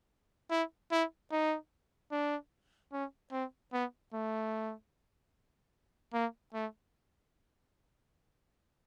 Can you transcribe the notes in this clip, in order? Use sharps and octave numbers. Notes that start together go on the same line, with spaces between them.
E4
E4
D#4
D4
C#4
C4
B3
A3
A#3
A3